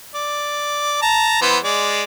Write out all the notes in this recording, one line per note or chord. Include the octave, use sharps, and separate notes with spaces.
D5
A5 A#5
E3 B3 C5
G#3 D5